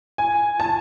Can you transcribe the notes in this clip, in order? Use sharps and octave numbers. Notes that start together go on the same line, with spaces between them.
G#5
A5